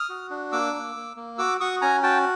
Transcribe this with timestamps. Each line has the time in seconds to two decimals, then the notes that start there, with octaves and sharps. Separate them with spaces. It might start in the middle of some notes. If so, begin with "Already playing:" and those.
Already playing: D#6 F6
0.09 F#4
0.30 D4
0.52 A#3 D6 E6
0.73 A#3
0.96 A#3
1.16 A#3
1.38 F#4 D6 E6
1.60 F#4 C#6 D#6
1.82 C#4 G#5 A#5
2.03 F#4 G5 A5